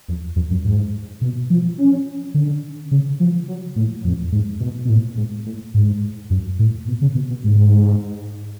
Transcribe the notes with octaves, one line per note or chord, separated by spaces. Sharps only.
F2
F2
F#2
G#2
B2
F3
C#4
D3
C#3
F3
F#3
A2
F2
G#2
B2
B2
A2
G#2
A2
G#2
F#2
A2
B2
C#3
B2
B2
G#2